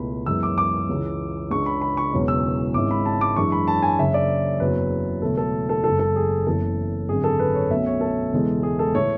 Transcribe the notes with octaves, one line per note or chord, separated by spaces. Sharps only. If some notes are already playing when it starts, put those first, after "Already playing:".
Already playing: C#2 B2 A3 E4 B5
F#2 E3 G#3 B3 E6
D6
D6
C#2 C#3 E3
C#2 C#3 G#3 D4 C#6
B5
B5
C#6
E1 E2 C#3 F#3 C#4
E6
G#1 G#2 G#3 C#4 E4 D6
B5
A5
D6
F#2 E3 G#3 D4 C#6
B5
A5
G#5
F#1 F#2 C#3 E5
D5
F#1 E2 C#3 F#3 B4
E1 E2 C#3 F#3 A3 A4
A4
A4
F#1 F#2 C#3 G#3 A4
A4
G#4
F#1 F#2 C#3 E3 B3 A4
G#1 F#2 D3 G#4
A4
B4
C#5
B1 B2 F#3 A3 C#4 E5
C#5
A4
E1 E2 C#3 E3 G#3
G#4
A4
A2 E3 A3 C#5